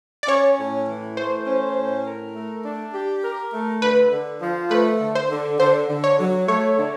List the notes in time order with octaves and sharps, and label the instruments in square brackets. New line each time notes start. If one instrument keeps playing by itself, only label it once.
[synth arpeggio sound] D5
[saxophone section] C#4 [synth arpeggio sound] C#5
[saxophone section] A2
E3
[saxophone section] A3 [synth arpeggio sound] C5
[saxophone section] C#4
A2
A#4
A3
D4
G4
A#4
A3
[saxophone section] D3 [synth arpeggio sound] B4
[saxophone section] D3
F3
[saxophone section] A3 [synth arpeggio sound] B4
[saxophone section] D3
[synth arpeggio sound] C5
[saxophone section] D3
[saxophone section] D3 [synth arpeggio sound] C5
[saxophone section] D3
[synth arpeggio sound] C#5
[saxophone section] F#3
[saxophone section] A3 [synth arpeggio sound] C#5
[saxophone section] D3